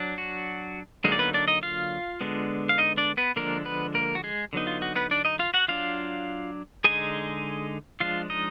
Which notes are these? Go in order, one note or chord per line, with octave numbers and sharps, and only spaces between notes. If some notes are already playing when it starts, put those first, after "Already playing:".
Already playing: F#3 D4
F#4
D3 F#3 G#3 A#3 D#4 G#4
D5
B3 B4
D4 D5
D#4 D#5
F4 F5
D3 G#3 B3 D4
F5
D#4 D#5
D4 D5
B3 B4
D3 F3 G#3 A#3 D4 A#4
B3 B4
A#3 A#4
F#4
G#3 G#4
D3 F#3 B3 D#4
F4
F#4
B3 B4
D4 D5
D#4 D#5
F4 F5
F#4 F#5
F#3 D4 F4 F5
D3 G#3 D#4 G#4 G#5
F3 G#3 D4 F4 F5
D#4 D#5